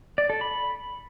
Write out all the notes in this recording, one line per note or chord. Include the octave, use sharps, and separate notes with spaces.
D5
A4
B5